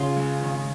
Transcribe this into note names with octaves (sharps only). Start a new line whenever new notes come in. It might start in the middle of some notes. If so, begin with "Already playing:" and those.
Already playing: C#3 F4
G#3
D#3